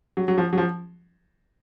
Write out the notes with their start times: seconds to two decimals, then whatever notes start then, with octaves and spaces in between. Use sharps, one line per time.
0.17 F#3
0.28 F#3
0.38 F3
0.53 F#3
0.58 F3